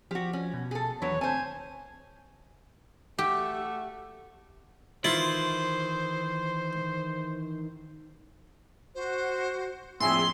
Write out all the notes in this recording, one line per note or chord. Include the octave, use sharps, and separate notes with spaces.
F3 F#4 G4
C#4
B2
G#4 A4
D#2 E3 F#3 D4 B4 C#5
D2 C4 C5 G#5 A5
A3 F#4 G4 E5
D#3 E3 E4 F4 C5
F#4 C5
A#1 F2 A2 G#4 E5 G#5 C6 E6